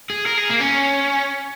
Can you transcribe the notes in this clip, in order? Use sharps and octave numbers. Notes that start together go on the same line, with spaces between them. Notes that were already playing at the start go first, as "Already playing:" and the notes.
G#4
A#4
G#4
A#3
C#4